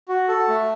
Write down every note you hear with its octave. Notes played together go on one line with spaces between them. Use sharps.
F#4
A4
A3